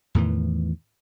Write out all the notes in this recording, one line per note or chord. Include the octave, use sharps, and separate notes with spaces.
E2 A2 D#3 E3